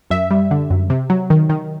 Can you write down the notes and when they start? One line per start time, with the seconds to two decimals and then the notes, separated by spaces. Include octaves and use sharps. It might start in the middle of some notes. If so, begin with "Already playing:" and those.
0.10 F#2 E5
0.31 G3
0.51 D3
0.70 F#2
0.90 C3
1.10 F#3
1.30 D#3
1.49 D#3